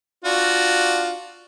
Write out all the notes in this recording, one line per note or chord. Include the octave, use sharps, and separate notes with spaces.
D4 F4 F#4